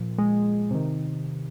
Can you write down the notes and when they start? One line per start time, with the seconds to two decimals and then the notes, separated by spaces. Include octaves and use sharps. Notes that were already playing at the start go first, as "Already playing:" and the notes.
Already playing: A#2 F3
0.18 G#3
0.71 C3 D#3